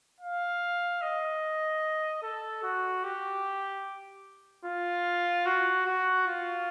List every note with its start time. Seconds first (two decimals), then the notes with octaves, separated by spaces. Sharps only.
0.20 F5
1.02 D#5
2.22 A4
2.63 F#4
3.04 G4
4.65 F4
5.46 F#4
5.86 F#4
6.27 F4